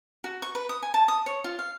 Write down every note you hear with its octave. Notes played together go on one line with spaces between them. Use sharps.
F#4
C#6
B4
D#6
G#5
A5
D#6
C#5
F4
F5